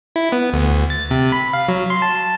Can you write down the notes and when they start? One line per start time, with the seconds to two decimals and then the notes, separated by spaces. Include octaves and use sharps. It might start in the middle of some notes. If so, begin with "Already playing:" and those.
0.16 E4
0.32 B3
0.53 D2
0.90 A6
1.11 C3
1.32 B5
1.53 F5
1.69 F#3
1.90 C6
2.02 A5